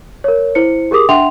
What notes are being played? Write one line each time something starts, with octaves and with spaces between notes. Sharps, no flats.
A#4 C#5
E4 C5 C#7
G4 G#4 A#4 D6 D#6
D4 E5 F#5 G5 C6 F7